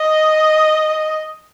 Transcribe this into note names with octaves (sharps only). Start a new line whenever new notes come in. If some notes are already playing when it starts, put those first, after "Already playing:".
Already playing: D#5